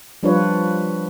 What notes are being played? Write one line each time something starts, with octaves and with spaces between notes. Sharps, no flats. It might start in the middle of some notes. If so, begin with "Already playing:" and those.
F3 G3 D4 F4 B4 C#5